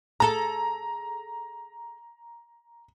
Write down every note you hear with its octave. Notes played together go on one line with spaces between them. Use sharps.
G#4 A4 A#5